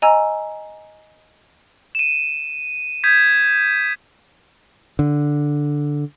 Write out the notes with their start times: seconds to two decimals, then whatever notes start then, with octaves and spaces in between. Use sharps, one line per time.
0.02 D#5 G#5 A#5 E6
1.95 D#7 E7
3.04 D#6 G6 G#6 B6
4.99 D3